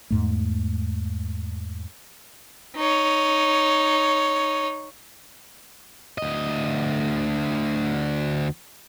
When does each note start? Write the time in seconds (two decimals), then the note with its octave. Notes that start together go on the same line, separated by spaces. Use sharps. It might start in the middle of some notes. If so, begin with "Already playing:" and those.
0.10 E2 G#2 A3
2.77 D#4 C#5
6.18 D2 D#5